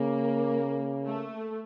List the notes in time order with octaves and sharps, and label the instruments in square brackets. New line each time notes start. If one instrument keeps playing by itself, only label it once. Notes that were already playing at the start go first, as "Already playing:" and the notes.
Already playing: [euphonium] C#3 [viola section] A#3
[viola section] A3